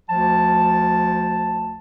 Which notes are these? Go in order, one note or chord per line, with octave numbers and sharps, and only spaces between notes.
D2 F3 A5